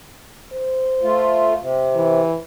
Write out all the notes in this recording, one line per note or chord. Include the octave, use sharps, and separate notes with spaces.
C5
A3 F4
C3
E3